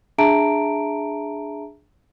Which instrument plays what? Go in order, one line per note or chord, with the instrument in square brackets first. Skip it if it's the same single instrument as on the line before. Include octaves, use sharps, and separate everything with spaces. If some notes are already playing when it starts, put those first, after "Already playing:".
[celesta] D4 G#4 E5 A5 A#5 D7